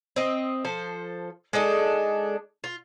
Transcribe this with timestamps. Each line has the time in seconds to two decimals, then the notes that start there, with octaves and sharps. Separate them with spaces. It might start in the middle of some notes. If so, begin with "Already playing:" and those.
0.16 C4 D#5
0.65 F3 A4 C5
1.53 G#3 D4 D#4 A4
2.64 F4